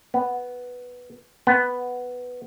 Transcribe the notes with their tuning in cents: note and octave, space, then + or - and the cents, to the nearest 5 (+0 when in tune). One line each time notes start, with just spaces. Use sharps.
B3 +0
B3 +5